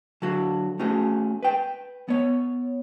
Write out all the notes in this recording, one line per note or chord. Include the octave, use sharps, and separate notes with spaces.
D3 F#3 F#4
A3 C#4 F#4 G#4
B4 G5
B3 C#5